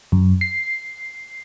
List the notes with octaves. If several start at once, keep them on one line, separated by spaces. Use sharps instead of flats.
F#2
C7